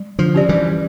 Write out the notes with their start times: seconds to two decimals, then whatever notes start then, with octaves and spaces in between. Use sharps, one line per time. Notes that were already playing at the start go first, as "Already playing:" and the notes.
Already playing: G3
0.19 D3 F3
0.34 C#4 G4 D5
0.49 E3 G3